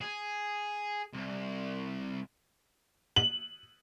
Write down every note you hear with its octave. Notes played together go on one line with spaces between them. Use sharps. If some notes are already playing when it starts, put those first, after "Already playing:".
G#4
C2
F#7